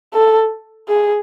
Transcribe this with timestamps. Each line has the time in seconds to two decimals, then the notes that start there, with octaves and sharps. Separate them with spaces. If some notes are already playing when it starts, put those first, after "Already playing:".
0.14 A4
0.88 G#4